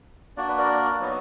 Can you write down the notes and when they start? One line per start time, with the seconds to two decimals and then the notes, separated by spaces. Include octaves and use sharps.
0.37 A#3 D4 F#4 D5
0.48 B4
0.58 A#4 D5
1.00 F#3 B3 D#4 F#4